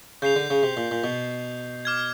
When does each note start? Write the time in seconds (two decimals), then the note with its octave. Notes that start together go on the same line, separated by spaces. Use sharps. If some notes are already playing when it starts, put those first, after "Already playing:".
0.22 C#3 G6 C7 F7
0.36 D3
0.50 C#3
0.63 C3
0.77 A#2
0.91 A#2
1.04 B2
1.85 D6 F6 G#6